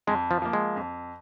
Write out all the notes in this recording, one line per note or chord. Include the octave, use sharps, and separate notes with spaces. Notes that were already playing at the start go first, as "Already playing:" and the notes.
F2 G#3
F3
F3 A#3
G#3
F2